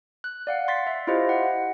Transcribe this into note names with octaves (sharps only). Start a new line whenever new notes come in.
F#6
D5 F5 F#5
C6 A6 B6
E5
E4 F4 G4 C5 D#5 F5
F#5